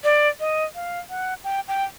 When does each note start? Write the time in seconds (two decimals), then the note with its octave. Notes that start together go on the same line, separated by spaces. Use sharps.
0.04 D5
0.40 D#5
0.75 F5
1.10 F#5
1.44 G5
1.68 G5